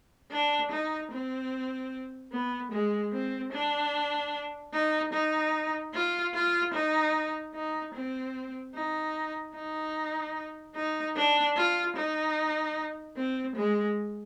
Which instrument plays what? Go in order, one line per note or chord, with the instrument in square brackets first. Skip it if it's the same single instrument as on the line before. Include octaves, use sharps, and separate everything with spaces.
[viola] D4
D#4
C4
B3
G#3
C4
D4
D#4
D#4
F4
F4
D#4
D#4
C4
D#4
D#4
D#4
D4
F4
D#4
C4
G#3